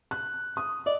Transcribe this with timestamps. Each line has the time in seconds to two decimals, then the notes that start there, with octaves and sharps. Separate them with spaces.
0.11 F#6
0.57 D#6
0.86 D5 D#5